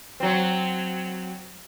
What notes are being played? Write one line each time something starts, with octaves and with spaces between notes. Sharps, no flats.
F#3 C4